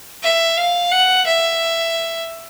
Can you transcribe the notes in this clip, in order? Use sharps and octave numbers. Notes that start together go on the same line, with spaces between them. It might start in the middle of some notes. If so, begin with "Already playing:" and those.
E5
F5
F#5
E5